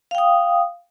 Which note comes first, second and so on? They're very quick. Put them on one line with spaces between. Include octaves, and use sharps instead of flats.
F5 G5 D#6